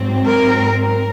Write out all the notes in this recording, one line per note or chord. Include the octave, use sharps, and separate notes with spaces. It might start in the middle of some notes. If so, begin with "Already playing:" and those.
Already playing: G#2 F#3 C4
A#4
A#4